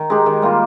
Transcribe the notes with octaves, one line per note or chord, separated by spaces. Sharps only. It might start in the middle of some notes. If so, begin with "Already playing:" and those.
Already playing: D#3
G#3 D#4 G4
D#3
G3 A#3 F4